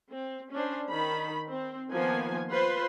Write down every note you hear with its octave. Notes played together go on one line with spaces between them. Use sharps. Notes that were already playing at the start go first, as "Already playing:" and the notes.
C4
C#4 D4 C5
D#3 B5
C4
D#3 F3 A#3 B3 G#5
F4 B4 C5 C6